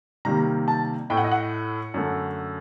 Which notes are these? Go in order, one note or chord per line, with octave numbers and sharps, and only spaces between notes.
C3 D#3 G3 A#3 A#5
A5
A2 A3 G5
F#5
D#5
F#5
F#2 D3 A3